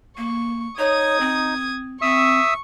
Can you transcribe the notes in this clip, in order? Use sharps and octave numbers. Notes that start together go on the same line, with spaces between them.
A#3 C#6
D#4 C#5 D#6 G#6
C4
C4 E5 C#6 D#6 E6